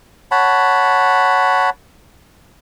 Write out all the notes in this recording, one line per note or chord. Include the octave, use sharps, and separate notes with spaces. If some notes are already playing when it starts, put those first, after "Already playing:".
C#5 F#5 A5 B5